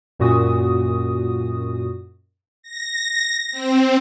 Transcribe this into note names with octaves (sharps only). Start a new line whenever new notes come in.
F#2 A#2 F#4 D#6
A#6
C4